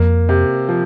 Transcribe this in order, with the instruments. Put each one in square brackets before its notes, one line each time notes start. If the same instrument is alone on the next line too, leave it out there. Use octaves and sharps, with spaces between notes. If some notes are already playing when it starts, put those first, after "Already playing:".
Already playing: [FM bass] F2 [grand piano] A#3
[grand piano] C3
F3